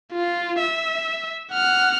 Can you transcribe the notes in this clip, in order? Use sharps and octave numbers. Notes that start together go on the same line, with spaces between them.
F4
E5
F#5 F6